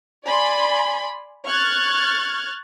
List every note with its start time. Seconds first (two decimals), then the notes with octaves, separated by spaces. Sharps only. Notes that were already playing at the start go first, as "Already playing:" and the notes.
0.25 D5 G#5 B5 C6
1.46 C#6 F6 F#6 G#6 A6